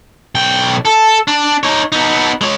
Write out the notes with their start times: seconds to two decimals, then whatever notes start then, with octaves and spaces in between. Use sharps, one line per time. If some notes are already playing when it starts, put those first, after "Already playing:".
0.35 B1 G5
0.85 A4
1.28 D4
1.63 D#4 C#5
1.92 B3 D#4
2.41 G#3 C#5